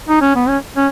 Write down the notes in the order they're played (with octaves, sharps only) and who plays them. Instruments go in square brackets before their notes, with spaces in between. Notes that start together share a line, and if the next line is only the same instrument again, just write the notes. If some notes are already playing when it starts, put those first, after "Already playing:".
[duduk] D#4
C#4
B3
C#4
C#4